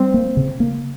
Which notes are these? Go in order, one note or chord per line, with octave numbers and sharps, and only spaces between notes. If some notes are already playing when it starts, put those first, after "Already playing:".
Already playing: G3 C4
A#3
C#3
A#3